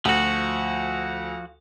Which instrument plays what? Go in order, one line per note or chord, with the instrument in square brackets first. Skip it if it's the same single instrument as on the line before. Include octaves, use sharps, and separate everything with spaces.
[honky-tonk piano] D2 [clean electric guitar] F3 F#4